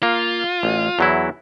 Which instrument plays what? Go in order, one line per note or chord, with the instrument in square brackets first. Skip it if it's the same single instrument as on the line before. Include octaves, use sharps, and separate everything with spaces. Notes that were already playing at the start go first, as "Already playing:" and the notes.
[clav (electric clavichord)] A#3 [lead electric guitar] F4
[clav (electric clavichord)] A1
E2 F#3 E4